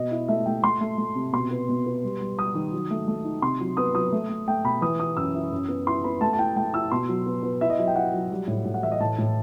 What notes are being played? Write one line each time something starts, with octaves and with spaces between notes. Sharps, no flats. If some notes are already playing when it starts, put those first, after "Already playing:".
Already playing: B2 D#5
E4
A3 E5
A3 G5
A3 C6
A3
A3
C3
B2 C6
B3
B2
B3
G3
G3
G3 D#6
D#3
F#3
A3
A3
D#4
C3 C6
F#3
B3 D#6
F#3 D#6
A3
A3
A3 G5
B2 B5
E3 D#6
E4 D#6
F#2 E6
E4
F#2
B3
E4 C6
B3 B5
A3 A5
A5
E4 G5
A3 G5
E4 E6
B2 C6
F#3
B3
B3
E4 E5
D#5
F#3 E5
G5
E4 F#5
F#3
G3
A2
A2
F#5
E3 E5
D#5
A2 A5
A2